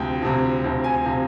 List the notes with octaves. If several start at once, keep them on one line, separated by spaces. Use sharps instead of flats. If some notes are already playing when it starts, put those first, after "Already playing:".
Already playing: D2 C3 F3 G5
D2 C3 F3
D2 C3 F3
G#5
C3 F3